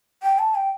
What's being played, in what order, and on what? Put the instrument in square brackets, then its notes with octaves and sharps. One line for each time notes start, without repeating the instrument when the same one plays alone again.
[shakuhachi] G5
A5
G5